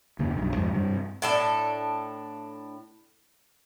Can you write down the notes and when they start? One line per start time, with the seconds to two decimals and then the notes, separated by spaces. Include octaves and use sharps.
0.19 F#1 E2 C3 A#3
0.37 B1 G2
0.56 F2 G#2 F3
0.74 G2 C3 G3
1.22 A2 D4 A4